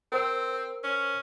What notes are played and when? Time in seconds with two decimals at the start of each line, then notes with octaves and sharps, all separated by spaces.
0.12 C4 A#4 C5 E6
0.84 C#4